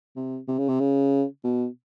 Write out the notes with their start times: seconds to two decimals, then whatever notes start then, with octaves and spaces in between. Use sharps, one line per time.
0.16 C3
0.48 C3
0.59 C#3
0.68 C3
0.80 C#3
1.44 B2